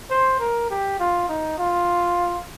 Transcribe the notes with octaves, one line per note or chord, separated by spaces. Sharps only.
C5
A#4
G4
F4
D#4
F4